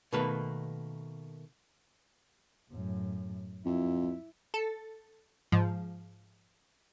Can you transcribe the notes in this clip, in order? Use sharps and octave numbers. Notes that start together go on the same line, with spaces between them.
B2 D#3 A3 A#3 B4
F#2 A2
F2 E4
A4
G#2 F3